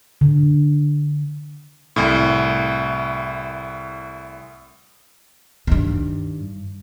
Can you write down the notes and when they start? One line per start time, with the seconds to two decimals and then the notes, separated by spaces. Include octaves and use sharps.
0.21 D3
1.96 C2 A2
5.67 G2 D#3